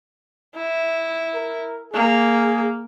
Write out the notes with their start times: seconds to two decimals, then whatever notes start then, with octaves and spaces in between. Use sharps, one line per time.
0.56 E4
1.34 A#4
1.94 A#3 G#4